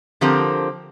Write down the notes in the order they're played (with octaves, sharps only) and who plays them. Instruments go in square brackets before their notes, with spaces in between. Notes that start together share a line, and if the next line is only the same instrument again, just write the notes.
[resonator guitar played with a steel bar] D3 F3 C4 G4 A#4